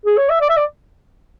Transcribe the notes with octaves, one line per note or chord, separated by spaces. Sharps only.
G#4
C#5
E5
D5
E5
D5